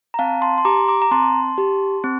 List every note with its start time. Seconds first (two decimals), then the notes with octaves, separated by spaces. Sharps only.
0.14 A#5
0.19 C4 F5 A5
0.42 A5 C6
0.58 C6
0.65 G4 A#5 D6
0.88 A#5 D6
1.02 A#5
1.11 C4 A5 C6
1.58 G4
2.04 C4